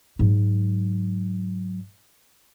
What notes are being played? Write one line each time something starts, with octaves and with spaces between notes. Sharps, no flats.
G#2 F#3